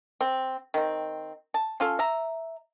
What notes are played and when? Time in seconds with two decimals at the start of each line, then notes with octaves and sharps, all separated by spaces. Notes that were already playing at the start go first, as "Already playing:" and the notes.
0.21 C4
0.74 D#3 C4
1.54 A5
1.80 C#4 F4 A4
1.99 E5 A#5